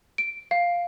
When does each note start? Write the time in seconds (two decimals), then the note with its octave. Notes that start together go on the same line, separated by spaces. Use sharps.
0.18 D7
0.51 F5